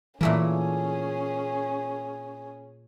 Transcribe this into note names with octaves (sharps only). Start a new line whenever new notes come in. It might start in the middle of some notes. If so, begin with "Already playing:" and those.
A#2 E3 A3 A#3 C#4 G#4